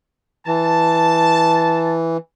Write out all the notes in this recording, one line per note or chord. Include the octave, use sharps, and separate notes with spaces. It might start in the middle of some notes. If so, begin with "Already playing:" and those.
E3 A5